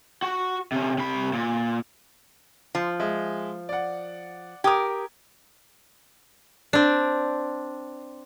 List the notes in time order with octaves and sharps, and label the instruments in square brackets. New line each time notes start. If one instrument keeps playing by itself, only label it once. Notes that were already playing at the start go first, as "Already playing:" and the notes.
[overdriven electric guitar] F#4
C3 C#4
C3 B5
A#2
[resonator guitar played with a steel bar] F3
[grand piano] G#3 E5
D5 F#5
[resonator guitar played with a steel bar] G4 A#4 [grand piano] D6 D#6 G#6
[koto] C4 D4